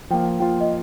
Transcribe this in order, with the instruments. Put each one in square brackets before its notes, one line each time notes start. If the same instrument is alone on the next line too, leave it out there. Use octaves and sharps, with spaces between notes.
[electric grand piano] F3 A#3 F4 [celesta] G5
[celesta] G5
[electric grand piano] F3 A#3 F4 [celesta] G5
[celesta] D#5